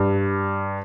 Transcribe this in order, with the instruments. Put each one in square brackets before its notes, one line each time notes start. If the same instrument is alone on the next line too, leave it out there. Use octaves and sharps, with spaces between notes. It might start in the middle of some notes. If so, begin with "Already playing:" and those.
Already playing: [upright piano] G2